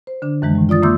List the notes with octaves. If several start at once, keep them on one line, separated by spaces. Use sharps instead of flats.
C5
D3 D4
F#2 D#3 E3 G#3
A2 G3
F4 D5 D#6 A6
A#3 E5 C6 D6 E6 G6